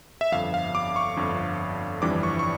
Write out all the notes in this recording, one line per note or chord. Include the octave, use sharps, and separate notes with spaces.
E5
G1 F2 D3 F5
F5
D6
C#6
G1 F2 D3
G1 F2 E3 G3 D4 D6
C#6
C#6